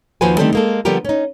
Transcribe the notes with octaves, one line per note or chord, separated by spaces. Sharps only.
D#2 F3 F#4 B4 C5 G#5
D3 D#3 G3 A3 C4 A4
G#3 A#3 A4
D3 F3 G3 B3 G4 A#4
C#4 D#4